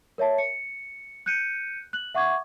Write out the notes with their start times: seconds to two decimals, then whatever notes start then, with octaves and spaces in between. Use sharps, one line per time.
0.18 A#4 C#5 E5 A5
0.38 C#7
1.26 F#6 G6 C#7 D#7
1.93 F#6 F#7
2.15 E5 F#5 C#6 D6 G#6